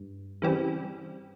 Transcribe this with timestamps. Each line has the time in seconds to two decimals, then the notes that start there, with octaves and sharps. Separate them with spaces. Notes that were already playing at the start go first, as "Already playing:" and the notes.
Already playing: G2
0.42 C#3 E3 G3 C4